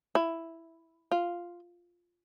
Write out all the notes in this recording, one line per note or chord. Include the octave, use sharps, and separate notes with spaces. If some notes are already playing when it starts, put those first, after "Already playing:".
E4
F4